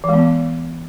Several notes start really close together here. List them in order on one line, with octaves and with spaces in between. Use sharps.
E3 G#3 B3